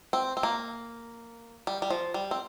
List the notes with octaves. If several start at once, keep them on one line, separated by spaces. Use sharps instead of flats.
C4
C4
A#3
G3
G3
F3
G3
C4